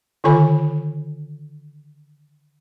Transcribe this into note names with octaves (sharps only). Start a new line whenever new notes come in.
D3 D#3 F4 A4 G#5 B5